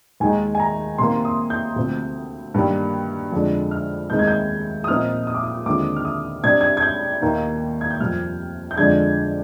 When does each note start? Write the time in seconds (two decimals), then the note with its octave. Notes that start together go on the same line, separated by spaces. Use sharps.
0.20 D#2 D#3 G#3 D#4 G#5
0.55 G#5
0.60 A#5
0.98 C3 D#3 A#3 C6
1.25 D#6
1.50 G6
1.76 D2 C3 F3 C4
2.54 G2 D#3 G3 A#3
3.32 F2 D3 G#3 D4
3.71 F6
4.10 D#2 D#3 G#3 C4 D#4 G6
4.19 G#6
4.28 G6
4.84 D#6
4.88 A#2 F3 C4 D#4 F6
5.27 D#6
5.35 D6
5.43 D#6
5.66 D#2 D3 F3 G#3 C4 D6
5.96 F6
6.05 D#6
6.44 C3 G3 D4 G#6
6.61 G#6
6.77 G#6
6.82 G6
7.22 D#2 D#3 A#3 D#4
7.81 G#6
7.91 G6
8.00 F2 C3 G3 F6
8.71 G6
8.78 F2 D3 G#3 D4 G#6